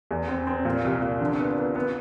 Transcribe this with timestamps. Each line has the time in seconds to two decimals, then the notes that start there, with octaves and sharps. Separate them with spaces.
0.11 E2
0.29 C4
0.47 C4
0.65 A#2
0.84 C2
1.02 A#2
1.21 D3
1.39 B3
1.58 B3
1.75 B3